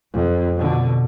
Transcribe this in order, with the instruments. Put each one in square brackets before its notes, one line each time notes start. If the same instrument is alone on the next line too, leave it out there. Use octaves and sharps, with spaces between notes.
[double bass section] F2
B2 D3